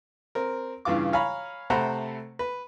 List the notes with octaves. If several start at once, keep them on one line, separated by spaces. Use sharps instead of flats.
C4 A#4
G2 C#3 E3 F4 D6
C#5 F5 G#5 A#5 B5
C3 A3 C5 F#5 A#5 B5
B4